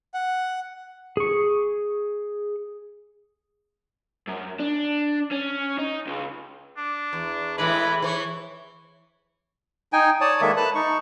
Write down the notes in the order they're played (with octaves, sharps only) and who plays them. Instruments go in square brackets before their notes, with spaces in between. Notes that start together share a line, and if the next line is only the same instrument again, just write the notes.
[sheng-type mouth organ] F#5
[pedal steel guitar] G#4 C#6
[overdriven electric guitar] F#2
D4
C#4
D#4
C#2
[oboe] D4
[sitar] E2
[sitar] A2 E3 G#3 [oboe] B4
[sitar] E3 B4 C#5
[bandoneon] D#4 G5 G#5
C#5 D5 A5 D#6
D#3 G#3 A#3 A4 E5
B4 A5 F#6
D#4 C#6